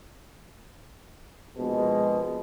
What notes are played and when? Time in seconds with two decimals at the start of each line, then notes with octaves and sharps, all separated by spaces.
1.57 A#1 B2 G#3